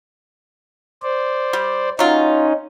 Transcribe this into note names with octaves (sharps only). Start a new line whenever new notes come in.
C5 D5
G3
F#3 C#4 D#4 F4